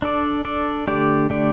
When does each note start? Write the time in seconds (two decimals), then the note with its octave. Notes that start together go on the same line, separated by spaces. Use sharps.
0.02 D4 A4 D5
0.45 D4 A4 D5
0.88 D3 A3 D4 G4 D5
1.30 D3 A3 D4 G4 D5